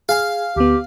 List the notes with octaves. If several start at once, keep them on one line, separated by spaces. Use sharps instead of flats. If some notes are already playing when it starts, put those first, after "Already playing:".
G#4 F5 G#5
D2 B3 G4